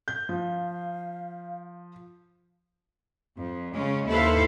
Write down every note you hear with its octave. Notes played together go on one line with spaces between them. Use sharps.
G6
F3 F5
F2
C#3 G#3 C#4
D#2 E4 A4 B4 C5 F5